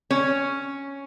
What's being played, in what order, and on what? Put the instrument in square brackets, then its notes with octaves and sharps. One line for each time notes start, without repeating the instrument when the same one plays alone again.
[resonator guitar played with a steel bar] C#4